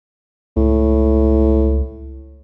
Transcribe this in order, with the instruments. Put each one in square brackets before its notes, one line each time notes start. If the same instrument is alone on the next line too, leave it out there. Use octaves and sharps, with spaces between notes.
[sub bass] C#2 [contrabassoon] A2